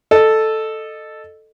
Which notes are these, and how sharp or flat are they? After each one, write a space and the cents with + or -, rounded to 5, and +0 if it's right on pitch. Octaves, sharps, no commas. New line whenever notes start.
A4 +0 D#5 -20